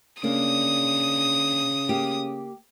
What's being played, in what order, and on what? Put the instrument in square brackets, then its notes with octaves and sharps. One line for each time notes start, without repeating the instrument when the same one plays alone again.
[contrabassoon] C#3 [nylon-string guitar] A#3 D4 [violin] D#6
[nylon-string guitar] A#3 G4